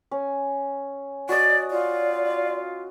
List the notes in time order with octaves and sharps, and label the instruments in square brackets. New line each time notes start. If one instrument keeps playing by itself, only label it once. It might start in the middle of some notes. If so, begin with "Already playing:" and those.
[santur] C#4
[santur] F#4 D#5 [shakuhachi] D5
[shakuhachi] F4 [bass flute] D5